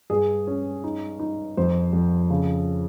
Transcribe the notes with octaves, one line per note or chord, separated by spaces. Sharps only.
G2 G#4
C#4
D#4
D#4
F2 C5
F2
C#3